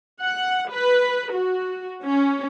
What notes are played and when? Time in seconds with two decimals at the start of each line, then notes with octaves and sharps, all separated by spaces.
0.22 F#5
0.71 B4
1.33 F#4
2.03 C#4